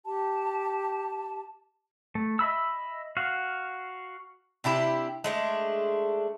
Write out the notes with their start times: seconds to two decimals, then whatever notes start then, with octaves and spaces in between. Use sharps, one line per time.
0.05 G4 A5
2.15 A3
2.39 D#5 E5 B5 E6
3.17 F#4 F5
4.64 C3 D4 E4 G4
5.24 G#3 A3 D4